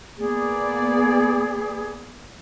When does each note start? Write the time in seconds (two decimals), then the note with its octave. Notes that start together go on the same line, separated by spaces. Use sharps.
0.17 A#3 B3 G#4 D5